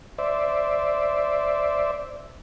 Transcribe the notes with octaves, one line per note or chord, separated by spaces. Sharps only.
C5 D5 E5